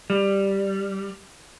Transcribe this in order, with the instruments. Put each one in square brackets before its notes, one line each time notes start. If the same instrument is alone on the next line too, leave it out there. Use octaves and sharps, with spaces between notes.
[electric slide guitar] G3